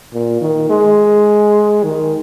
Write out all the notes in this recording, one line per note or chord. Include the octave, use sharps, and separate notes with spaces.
A#2
D#3
G#3
D#3